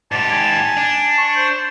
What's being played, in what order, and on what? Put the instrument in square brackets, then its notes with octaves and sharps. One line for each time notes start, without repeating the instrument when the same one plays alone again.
[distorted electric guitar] G#2 G4 [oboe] D5 [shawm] A5
[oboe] G#5
[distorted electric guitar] D4
[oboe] C#6
C5